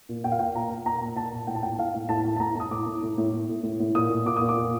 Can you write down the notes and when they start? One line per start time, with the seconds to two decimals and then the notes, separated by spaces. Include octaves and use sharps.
0.09 A#2
0.24 A#2 G5
0.32 F5
0.39 A#2 G5
0.55 A#2 A#5
0.70 A#2
0.86 A#2 A#5
1.01 A#2
1.16 A#2 A5
1.32 A#2
1.47 A2 G5
1.55 A5
1.63 A2 G5
1.78 A2 F5
1.94 A2
2.09 A2 A5
2.24 A2
2.36 A5
2.40 A2 A#5
2.55 A2 D#6
2.71 A2 D6
2.87 A2
3.03 A2
3.18 A2
3.33 A2
3.49 A2
3.63 A2
3.80 A2
3.95 A#2 D#6
4.10 A#2
4.26 A#2 D6
4.37 D#6
4.42 A#2
4.49 D6
4.57 A#2